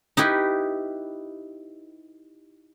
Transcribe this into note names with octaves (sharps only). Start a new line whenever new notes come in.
D#4 E4 G4 B4